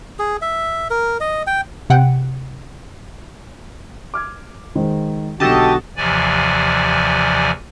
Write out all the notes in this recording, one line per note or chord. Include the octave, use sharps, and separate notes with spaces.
G#4
E5
A#4
D#5
G5
C3 F#5 G5
D6 F6 G#6
D#3 G#3 C5
B1 D3 F#4 G4 A4 D#5 A5
D#2 C3 E3 F3 D5 G#5